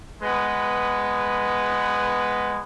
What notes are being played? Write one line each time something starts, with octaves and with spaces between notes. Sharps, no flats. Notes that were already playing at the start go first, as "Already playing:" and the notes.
G#3 B3 B4